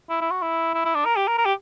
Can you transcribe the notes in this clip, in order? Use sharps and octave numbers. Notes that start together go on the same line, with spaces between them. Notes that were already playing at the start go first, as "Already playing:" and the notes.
E4
E4
F#4
E4
E4
E4
D4
A#4
G4
A#4
A#4
G4